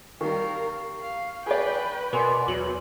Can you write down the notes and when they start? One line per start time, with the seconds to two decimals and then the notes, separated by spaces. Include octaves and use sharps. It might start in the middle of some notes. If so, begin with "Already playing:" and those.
0.21 D#3 G3 A#4 F5 C#6
1.01 F5
1.46 G#4 B4 D5 G5
2.13 B2 B3 A#4 D5 G#5 C6
2.48 E2 F#3 F#7